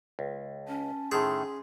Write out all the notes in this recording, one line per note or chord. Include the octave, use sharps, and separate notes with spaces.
C#2
C#4 A5
A2 D#3 A3 G#4 C6